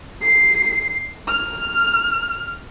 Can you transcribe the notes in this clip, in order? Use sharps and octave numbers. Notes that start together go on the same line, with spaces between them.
C7
F6